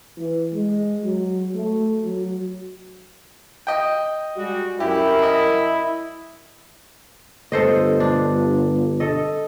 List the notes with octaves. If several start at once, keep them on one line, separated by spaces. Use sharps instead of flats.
E3
G#3
F#3
A3
F#3
D#5 G5
G3 G#3 F#4
F#2 E4 G4 A#4
D#5
G1 A4 C5 D#5
D4
A4 D#5